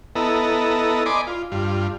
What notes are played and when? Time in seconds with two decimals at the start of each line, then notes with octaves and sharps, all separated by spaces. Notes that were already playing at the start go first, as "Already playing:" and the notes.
0.16 B3 E4 A4 D#5 A#5
1.06 D5 D#5 G#5 B5 C6 D6
1.27 F4
1.52 G2 F4